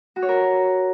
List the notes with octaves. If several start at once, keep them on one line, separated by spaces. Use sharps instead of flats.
F#4
C#5
A#4